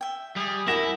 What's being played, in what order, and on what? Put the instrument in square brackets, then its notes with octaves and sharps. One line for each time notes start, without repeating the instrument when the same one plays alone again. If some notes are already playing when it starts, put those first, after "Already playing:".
[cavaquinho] E5 G5
[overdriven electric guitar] G3 [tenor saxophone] G#4
[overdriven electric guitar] E4 [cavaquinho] F#4 G#4 E5 [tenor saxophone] A#4 [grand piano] A#6 E7